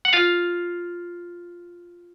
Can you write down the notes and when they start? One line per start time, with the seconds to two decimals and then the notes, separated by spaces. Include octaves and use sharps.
0.05 F#5
0.13 F4 F5